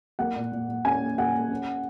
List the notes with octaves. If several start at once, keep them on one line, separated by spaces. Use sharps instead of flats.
A#3 F#5
A#2
A#2
A#2
C#4 G#5
A#2
A#2 F#5
A#2
C#4